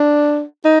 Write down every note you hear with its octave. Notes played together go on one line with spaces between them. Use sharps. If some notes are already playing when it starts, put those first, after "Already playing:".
Already playing: D4
D#4